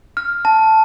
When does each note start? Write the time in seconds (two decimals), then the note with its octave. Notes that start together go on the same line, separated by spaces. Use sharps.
0.17 F6
0.45 A5